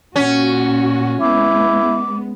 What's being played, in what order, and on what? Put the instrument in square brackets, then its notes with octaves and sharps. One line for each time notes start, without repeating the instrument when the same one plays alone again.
[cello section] A#2 F#4 [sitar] C#4
[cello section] G#3 B3 [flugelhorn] E4 [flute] D6